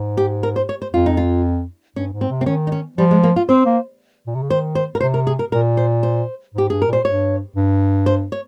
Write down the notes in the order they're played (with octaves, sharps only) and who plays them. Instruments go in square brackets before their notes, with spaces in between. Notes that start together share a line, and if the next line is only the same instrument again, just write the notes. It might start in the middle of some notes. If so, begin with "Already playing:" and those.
Already playing: [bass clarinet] G#2
[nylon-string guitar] G4
A#4
C5
C#5
C5
[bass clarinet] F2 [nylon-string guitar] F4
[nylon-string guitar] D#4
F4
[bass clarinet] G2 [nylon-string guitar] C#4
[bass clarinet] G#2
[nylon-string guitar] C4
[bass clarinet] C3
[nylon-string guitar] C4
[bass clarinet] D#3 [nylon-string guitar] C#4
[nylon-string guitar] D#4
C#4
[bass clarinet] F3 [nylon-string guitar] G3
[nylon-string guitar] G#3
A#3
F4
[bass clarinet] C4 [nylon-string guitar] C5
[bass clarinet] A#3
A#2
C3
C#3
[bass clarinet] D#3 [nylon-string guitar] C5
[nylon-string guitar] C5
A#4
[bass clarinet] C3 [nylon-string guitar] C5
[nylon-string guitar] A#4
G#4
A#4
[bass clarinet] A#2 [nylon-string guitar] A#4
[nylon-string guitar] C5
C5
[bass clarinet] G#2 [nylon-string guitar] G4
[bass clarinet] G2 [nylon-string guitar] G#4
[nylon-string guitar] A#4
[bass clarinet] A#2
[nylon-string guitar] C5
[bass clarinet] G2 [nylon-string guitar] C#5
[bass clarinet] G2
[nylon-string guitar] C5
C#5